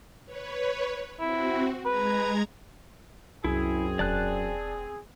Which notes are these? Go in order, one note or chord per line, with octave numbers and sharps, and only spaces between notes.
B4 C#5
C4 E4 F#4
G#3 B4 A#5 G#6
C2 F#2 C4 E4 G#4
E1 D5 A5 F#6